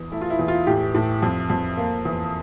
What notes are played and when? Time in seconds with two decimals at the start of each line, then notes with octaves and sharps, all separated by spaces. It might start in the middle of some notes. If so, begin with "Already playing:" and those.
Already playing: E2
0.12 A3 E4
0.21 F4
0.30 E4
0.39 E2
0.48 F4
0.67 A2 G4
0.94 A2
1.23 F2
1.50 F2
1.78 A#3
2.05 E2